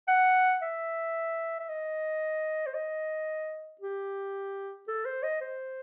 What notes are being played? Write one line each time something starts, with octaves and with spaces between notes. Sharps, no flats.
F#5
E5
E5
D#5
C5
D#5
G4
A4
C5
D#5
C5